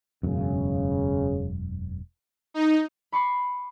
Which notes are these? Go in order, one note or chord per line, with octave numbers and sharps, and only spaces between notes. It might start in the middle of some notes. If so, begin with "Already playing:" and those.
E1 F#2 C#3
D#4
B5 C#6 D6 C7